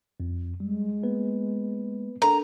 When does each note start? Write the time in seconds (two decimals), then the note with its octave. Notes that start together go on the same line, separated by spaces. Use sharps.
0.20 F2
0.60 G3 G#3
1.03 A#3 B3 B4
2.22 D4 A4 A#4 A#5